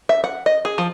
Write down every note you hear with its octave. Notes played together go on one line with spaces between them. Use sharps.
E5
F#5
D#5
G#4
F3